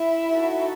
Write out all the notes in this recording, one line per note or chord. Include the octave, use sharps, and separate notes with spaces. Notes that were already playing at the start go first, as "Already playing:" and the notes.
Already playing: E4 E5
D#4 F#4 A4